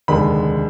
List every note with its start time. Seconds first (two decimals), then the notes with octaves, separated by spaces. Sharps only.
0.08 F1 D#2 D3 G#3 B5